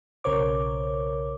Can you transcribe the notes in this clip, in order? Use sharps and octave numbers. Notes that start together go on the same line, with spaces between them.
B1 C#3 A#4 C5 C#5 D6